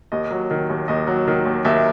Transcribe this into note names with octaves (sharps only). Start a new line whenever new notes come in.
D#2 D#5
F#3
D#3
D#2
D#2 D#5
F#3
D#3
D#2
D#2 E5